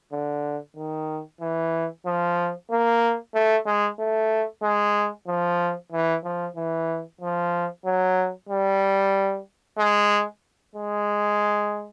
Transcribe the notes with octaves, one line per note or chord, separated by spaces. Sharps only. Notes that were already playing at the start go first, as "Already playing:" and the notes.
D3
D#3
E3
F3
A#3
A3
G#3
A3
G#3
F3
E3
F3
E3
F3
F#3
G3
G#3
G#3